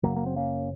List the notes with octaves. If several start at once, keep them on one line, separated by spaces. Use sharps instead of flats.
F#1 F#2 C#3 F#3 A#3
A#3
C4
A#3 C#4